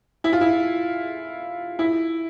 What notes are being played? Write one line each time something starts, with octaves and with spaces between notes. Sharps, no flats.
E4
F4
E4
E4